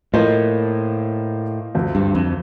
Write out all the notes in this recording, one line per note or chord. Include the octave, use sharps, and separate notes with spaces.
A2 F3 A#3 F4 C5 D#5
D2 C3 F3 C4
G2
F2